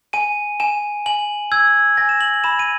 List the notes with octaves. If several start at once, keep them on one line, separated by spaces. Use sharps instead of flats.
G#5 D#7
G#5 E7
G#5 F#7
E6 G#6
G#5 A#6
E7
F#7
B5 E7
D#7